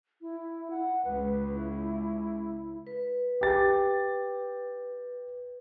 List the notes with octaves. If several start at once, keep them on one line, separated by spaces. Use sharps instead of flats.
E4
F#5
C#2 B4
E4
B4
G4 A6